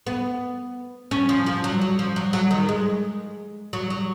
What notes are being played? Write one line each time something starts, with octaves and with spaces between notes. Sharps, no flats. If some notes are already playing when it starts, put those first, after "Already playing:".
B3
C#4
F3
F3
F#3
F#3
F3
F#3
F#3
D#3
G#3
F#3
F#3